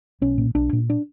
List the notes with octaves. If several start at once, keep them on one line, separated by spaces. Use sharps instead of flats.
B1 C#4
A#2
B1 D4
A#2
D4